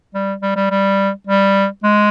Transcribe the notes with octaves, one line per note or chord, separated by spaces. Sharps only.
G3
G3
G3
G3
G3
G#3